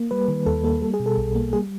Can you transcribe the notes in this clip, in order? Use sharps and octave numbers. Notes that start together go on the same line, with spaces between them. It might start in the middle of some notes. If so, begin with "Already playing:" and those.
Already playing: A#3
G3 B4
D#3
D#2 A4
A#3 A4
G3 A4
G#4
B2
A4
B1
A#3
G3 G#4